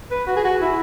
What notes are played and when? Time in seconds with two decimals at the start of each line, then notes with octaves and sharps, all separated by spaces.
0.11 B4
0.27 F#4
0.36 G#4
0.44 F#4
0.61 E4